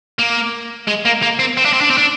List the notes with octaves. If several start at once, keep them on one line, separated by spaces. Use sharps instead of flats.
A#3
G#3
A#3
A#3
C4
C4
D4
C4
D4
C4
D4